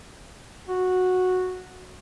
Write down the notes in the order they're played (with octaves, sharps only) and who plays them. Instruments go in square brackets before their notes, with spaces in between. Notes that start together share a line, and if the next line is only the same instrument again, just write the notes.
[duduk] F#4